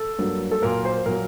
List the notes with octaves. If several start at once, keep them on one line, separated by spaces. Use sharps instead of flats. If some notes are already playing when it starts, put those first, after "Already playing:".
Already playing: A4
G2 F#3 A#3
A4
A#2 F#3 A#3 A#4
C5
A#2 F#3 A#3 A#4